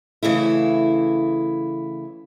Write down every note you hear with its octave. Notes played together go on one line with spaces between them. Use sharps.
C#3 E3 A3 E4